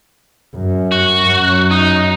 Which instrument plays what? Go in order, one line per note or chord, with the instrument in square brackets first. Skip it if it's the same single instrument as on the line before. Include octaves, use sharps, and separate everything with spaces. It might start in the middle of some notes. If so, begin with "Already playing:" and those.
[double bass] F#2
[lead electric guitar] F#4
[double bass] F#2
[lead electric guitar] D#4